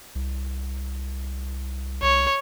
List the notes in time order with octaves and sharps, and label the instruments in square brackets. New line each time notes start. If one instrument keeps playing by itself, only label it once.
[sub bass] C2
[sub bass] C2 [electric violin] C#5